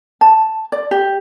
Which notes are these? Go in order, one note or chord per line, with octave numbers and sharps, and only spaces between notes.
A5
D5
G4